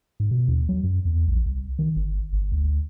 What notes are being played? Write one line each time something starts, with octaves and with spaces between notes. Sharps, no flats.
G#2
B2
D#2
F#3
F#2
E2
A#1
C2
D#3
G1
G1
D2